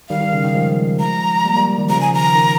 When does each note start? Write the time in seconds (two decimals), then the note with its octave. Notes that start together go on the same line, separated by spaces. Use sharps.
0.09 D#3 G3 F5
0.21 D#3
0.33 C#3
0.44 D#3
0.54 F3 G#3
1.00 A#5
1.44 G3 A#3
1.56 G3 A#3
1.78 D#3 G3
1.89 C#3 F3 A#5
2.01 G#5
2.12 D#3 A#5
2.35 D#3